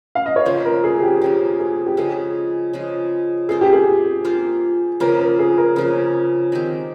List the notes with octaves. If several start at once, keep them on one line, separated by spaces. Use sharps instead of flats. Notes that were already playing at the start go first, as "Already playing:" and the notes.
F5
D#5
C#5
C#3 F3 A#3 C5
A#4
G#4
G#4
G4
C#3 F3 A#3 G4
G#4
G4
C#3 F3 G#3 G#4
C#3 F3 G#3
A#3 F4 G#4 C5
G4
G#4
A#3 F4 C5
C#3 F3 A#3 A#4
A#4
G#4
A#4
C#3 F3 A#3 A#4
D#3 G#3 C4 G4